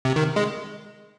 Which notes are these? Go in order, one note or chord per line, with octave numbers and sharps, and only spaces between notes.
C3
D#3
G#3